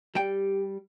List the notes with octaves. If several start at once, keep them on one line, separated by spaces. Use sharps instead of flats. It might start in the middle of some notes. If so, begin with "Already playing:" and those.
G3 G4 G5